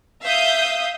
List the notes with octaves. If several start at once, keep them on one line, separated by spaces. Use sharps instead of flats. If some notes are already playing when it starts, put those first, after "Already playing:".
E5 F5 D#6 G6